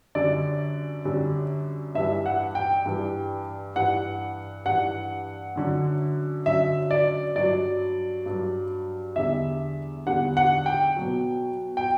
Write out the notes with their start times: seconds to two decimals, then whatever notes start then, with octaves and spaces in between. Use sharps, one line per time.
0.15 F#2 D3 G3 D5
1.05 F#2 D3 G3
1.95 G2 E3 G3 E5
2.26 F#5
2.55 G5
2.86 G2 E3 G3
3.76 G2 E3 G3 F#5
4.66 G2 E3 G3 F#5
5.55 F#2 D3 F#3
6.46 F#2 D3 F#3 E5
6.91 D5
7.36 G2 F#3 D5
8.26 G2 F#3
9.16 E2 D3 G3 E5
10.06 E2 D3 G3 F#5
10.37 F#5
10.66 G5
10.97 B2 F#3
11.77 G5